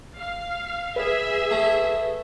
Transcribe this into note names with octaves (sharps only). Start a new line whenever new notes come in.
F5
G#4 B4 E5
A3